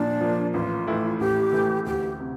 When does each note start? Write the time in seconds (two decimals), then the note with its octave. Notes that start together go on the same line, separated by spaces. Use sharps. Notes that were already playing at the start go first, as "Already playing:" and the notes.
Already playing: A#2 F3 A#3 D4
0.21 F3 A#3
0.54 A1 F4
0.87 A2 E3 A3 E4
1.20 A1 G4
1.53 A2 E3 A3 E4
1.86 D2 G4
2.20 C3